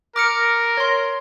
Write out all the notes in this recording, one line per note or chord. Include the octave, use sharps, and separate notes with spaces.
A#4 D6 F6 C#7
C#5 C6